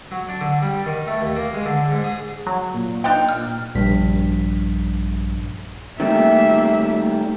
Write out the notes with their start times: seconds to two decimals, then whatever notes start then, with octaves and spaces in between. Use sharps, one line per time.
0.11 F#3
0.29 D4
0.41 D3
0.62 G3
0.86 D#3
1.07 A3
1.21 D#2
1.36 A#3
1.54 G#3
1.66 D3
1.91 G#2
2.04 G#4
2.47 F#3
2.74 A#2
3.04 D4 D#4 G5
3.29 F6
3.75 A#1 G2 B6
6.00 D#3 G3 A3 A#3 E5